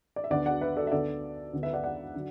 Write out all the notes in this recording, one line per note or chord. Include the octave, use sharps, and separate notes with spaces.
D5
E5
D2 D3 B3 D4 D5 F#5
D5 F#5
B4 E5
A4 D5
E5
D2 D3 B3 A4 D5
D2 D3 B3
B4 E5
D5 F#5
D5 F#5
D3 F#3